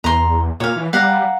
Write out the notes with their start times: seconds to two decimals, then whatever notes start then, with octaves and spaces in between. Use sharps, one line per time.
0.04 E2 A#5 C6
0.60 A#2 C#5 F5
0.76 E3
0.93 G3 F5 F#5 A#5